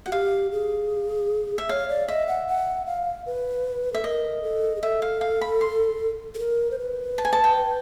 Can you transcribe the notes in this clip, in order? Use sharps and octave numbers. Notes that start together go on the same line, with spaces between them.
F#4 F#5
G4 F5
G#4
E5
C#5 F5
D5
D#5 E5
F#5
F#5
F5
B4
A4 E5
A#4 D#5
A4
G#4
A4 E5
F5
F5
B5
C6
A4
A#4
C5
B4
A5
G#5
A5
G5